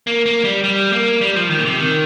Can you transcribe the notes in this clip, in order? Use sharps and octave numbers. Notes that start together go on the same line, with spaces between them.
A#3
A#3
G3
G3
A#3
G3
F3
D#3
A#2
C3
D#3